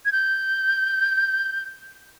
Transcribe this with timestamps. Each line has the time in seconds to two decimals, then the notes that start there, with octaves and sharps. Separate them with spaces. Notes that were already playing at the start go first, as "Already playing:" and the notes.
0.05 G#6
0.12 G6